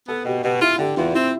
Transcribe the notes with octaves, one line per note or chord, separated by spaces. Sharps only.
B3 A4
B2 G4
B2 G4
E4 F4
D3 G4
E2 F4
C4 E4